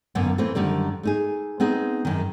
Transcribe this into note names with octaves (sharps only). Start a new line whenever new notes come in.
F#2 D3 D#3 A#3 B3
E3 A3 A#3 C4
F#2 D3 D#3 G3
A3 D#4 G#4
B3 C4 D#4 G#4
F#2 D#3